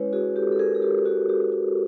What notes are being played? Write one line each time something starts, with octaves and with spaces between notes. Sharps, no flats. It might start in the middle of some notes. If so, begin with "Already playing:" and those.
Already playing: G#3 C#4 E4 B4 C#5
F#4 G#4
G4 A4
A4
G#4 A#4
G#4
G4 A4
A4
F#4 G#4
G4
G4
F#4